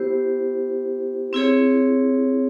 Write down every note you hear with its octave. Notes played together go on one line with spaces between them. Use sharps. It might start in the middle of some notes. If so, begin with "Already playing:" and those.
Already playing: B3 E4 G4 C5
C4 E4 G#4 C#5